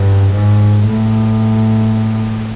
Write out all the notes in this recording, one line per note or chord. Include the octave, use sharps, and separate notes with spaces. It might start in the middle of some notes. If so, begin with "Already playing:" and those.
Already playing: G2
G#2
A2